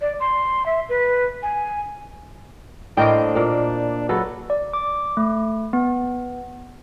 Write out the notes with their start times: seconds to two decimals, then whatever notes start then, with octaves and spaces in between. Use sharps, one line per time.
0.01 D5
0.20 C6
0.66 E5
0.89 B4
1.43 G#5
2.97 A2 A#3 D4 A#4 C5 D#5 G5
3.35 A#2 A#3
4.09 C#2 F#3 A4 B4
4.50 D5
4.73 D6
5.17 A3
5.73 B3